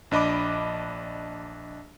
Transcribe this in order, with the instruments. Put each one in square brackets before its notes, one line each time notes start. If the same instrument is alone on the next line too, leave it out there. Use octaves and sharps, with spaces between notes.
[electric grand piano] A#1 D4 D#5 B5 D6